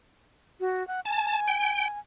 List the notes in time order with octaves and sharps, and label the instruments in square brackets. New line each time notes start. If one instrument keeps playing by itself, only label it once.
[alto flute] F#4
F#5
[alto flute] G#5 [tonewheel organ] A5
[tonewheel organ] G5